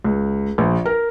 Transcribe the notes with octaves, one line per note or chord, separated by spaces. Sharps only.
C#2
A#1
A#4